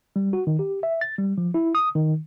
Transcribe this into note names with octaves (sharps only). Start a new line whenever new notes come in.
G3
F#4
D#3
G4
E5
A6
G3
F3
E4
D#6
D#3